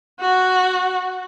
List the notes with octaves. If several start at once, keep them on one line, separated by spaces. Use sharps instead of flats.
F#4